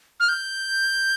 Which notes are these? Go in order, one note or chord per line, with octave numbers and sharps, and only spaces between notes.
F6
G6